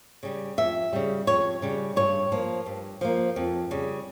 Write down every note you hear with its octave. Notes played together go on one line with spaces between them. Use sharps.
C#3 G3
F2 E5
C#3 G3
F2 C#5
C#3 G3
G2 C#5
F3 A#3
G2
F3 A#3
F2
C#3 G3